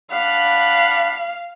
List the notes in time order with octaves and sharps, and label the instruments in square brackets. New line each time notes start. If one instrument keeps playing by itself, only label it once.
[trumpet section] D4 F#5 B5 [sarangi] F5